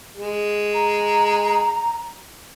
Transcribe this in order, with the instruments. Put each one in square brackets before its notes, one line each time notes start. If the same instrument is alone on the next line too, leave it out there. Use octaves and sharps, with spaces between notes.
[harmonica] G#3
[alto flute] A#5